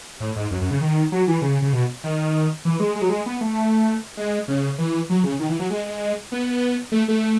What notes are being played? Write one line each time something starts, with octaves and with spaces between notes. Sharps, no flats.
A2
G#2
F#2
F#2
C#3
D#3
F#3
E3
C#3
C#3
B2
D#3
E3
G#3
G#3
F#3
G#3
B3
A3
G#3
C#3
E3
F#3
C#3
D#3
E3
F#3
G#3
B3
A3
A3